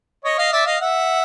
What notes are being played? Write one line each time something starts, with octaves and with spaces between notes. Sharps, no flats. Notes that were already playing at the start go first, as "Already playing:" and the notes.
C#5 D#5
D#5 F5
D5 E5
D#5 F5
E5 F#5